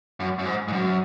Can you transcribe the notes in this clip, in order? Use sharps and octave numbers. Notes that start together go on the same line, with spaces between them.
F#2
F#2
G#2
G#2
F#2